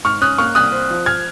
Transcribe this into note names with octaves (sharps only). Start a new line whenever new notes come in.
G#2 C#6 F6
C#4 D#6 F#6
A#3 C#6 F6
C2 D#6 F#6
C4
F3
F6 G#6